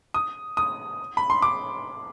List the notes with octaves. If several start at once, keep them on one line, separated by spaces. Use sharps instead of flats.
D#6
D#6
B5
C6
D6